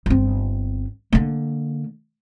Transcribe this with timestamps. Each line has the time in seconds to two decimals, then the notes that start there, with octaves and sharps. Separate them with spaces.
0.06 G1 C4
1.12 D3 A#3